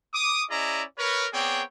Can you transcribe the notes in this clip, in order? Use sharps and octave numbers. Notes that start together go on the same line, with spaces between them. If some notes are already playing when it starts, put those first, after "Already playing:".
D6 D#6
C#4 E4 G#4 D5 D#5 A#5
A#4 B4 C#5
B3 C4 G#4 C#5 D5 G5